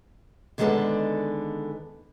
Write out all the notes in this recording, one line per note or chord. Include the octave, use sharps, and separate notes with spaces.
D3 D#3 G#3 B3 A4 D5